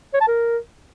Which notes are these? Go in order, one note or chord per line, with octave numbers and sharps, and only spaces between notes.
C#5
A5
A#4